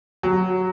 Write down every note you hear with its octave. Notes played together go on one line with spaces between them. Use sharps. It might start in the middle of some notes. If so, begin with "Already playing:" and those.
F#3